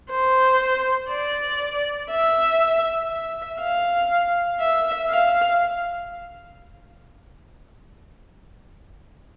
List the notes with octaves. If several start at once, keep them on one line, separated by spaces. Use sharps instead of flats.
C5
D5
E5
E5
F5
E5
F5